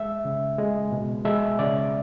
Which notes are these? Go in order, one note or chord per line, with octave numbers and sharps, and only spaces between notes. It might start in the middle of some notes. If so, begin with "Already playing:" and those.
Already playing: G#3 E5
C#3
G#3
B2
G#3 E5
C#3 D5